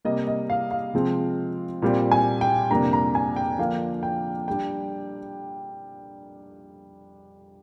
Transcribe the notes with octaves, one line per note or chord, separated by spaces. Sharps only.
C3 G3 A#3 D#5
D#5
F5
F5
C3 F3 G#3 C4
A#2 G3 C4
G#5
G5
F2 C3 G3 A#3 D4 A#5
A#5
G#5
G5
D3 F3 A#3 D4 F5
G5
G3 D4 G5